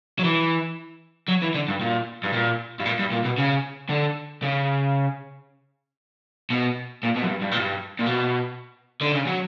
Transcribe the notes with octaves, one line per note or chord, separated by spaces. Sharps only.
F#3
E3
F#3
E3
D3
G2
A#2
G2
A#2
G2
A#2
G2
A#2
B2
C#3
D3
C#3
B2
A#2
B2
F#2
G2
G2
A#2
G2
A#2
B2
D3
C#3
F#3